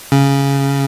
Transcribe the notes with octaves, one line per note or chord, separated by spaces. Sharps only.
C#3